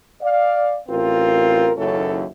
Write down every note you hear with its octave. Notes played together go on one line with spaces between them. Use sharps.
D5 F5
A1 C4 F4 A#4
F#1 D#2 F#3 C#4 E4 A4